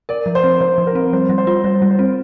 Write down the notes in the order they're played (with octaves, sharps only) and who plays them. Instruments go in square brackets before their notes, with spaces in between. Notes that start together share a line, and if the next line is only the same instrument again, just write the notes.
[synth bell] A#4 [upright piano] D5
[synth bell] F3
[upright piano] C5
[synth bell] C4
[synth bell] F3 [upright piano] C5
[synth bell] F3
[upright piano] A#4
[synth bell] C4
[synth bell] G3 [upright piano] C5
[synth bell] G3
[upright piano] C5
[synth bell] F4
[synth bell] G3 [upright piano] C5
[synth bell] G3
[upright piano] C5
[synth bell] C4